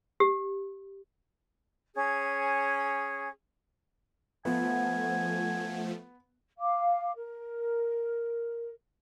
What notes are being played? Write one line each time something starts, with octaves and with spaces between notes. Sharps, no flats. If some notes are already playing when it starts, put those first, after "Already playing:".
G4
C#4 G#4 G#6
F3 A3 B3 F#5 G#5
F5 D6
A#4